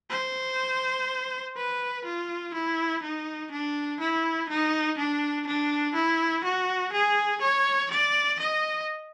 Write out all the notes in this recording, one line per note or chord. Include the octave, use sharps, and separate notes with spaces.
C5
B4
F4
E4
D#4
D4
E4
D#4
D4
D4
E4
F#4
G#4
C#5
D5
D#5